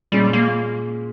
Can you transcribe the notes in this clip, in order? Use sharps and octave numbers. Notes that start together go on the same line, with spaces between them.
A#2 G3 G#3 C#4
A#3